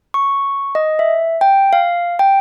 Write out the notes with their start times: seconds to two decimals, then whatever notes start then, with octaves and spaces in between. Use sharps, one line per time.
0.14 C#6
0.75 D#5
0.99 E5
1.41 G5
1.73 F5
2.19 G5